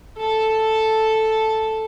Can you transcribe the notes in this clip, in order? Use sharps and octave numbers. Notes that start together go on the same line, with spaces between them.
A4 A5